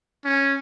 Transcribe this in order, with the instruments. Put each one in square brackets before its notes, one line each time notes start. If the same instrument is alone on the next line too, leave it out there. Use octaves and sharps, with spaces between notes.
[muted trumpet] C#4